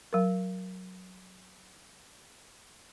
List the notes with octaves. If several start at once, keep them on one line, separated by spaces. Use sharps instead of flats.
F#3 A#4